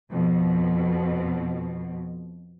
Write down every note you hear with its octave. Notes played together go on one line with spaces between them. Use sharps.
F2 B2